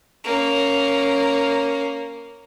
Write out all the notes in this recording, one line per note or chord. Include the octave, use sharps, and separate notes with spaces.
A#3 C#4